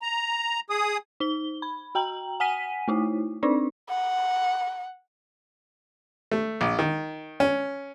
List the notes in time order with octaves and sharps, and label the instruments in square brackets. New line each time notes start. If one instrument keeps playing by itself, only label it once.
[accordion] A#5
G#4 D#6
[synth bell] D#4 G7
B5
F#4 G5 A#5 F#7
F#5 G#5 B6 D#7
A3 D#4 E4
C4 D4 D#4 D5
[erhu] F#5
[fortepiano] A3
A#1
D#3
C#4